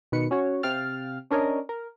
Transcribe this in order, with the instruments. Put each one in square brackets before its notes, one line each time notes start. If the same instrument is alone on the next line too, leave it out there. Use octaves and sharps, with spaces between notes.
[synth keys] B2 D#3 B4 C#7
C#4 F#4 C#5
C3 F5 G5 F6 A6
C#4 D4 A#4 C#5 D#5
A#4